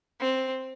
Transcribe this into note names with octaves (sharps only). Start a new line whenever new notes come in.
C4